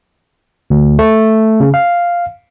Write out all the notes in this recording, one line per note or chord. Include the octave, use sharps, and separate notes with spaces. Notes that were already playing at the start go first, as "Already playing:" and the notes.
D2
A3
C#3
F5